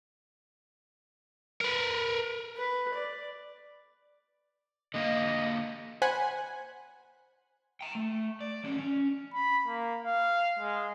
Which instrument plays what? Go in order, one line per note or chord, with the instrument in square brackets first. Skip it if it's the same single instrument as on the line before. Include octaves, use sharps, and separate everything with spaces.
[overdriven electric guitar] A#4 B4
[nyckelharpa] B4
D5
[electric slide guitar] D3 A#3 F5 [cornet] D#5
[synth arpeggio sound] C5 F#5 G#5 B5 F#6
[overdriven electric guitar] G5 A#5
A3
D5
F3 C#4
C#4
[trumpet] B5
A#3
F5
G#3